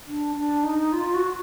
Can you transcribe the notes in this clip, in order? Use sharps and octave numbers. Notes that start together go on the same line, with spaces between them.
D4
D4
D#4
F4
F#4